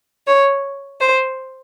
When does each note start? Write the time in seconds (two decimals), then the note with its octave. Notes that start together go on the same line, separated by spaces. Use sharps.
0.27 C#5
1.00 C5